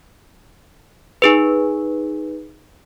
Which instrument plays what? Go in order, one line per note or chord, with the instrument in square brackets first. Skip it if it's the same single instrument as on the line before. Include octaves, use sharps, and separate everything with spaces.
[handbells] D#4 G#4 B4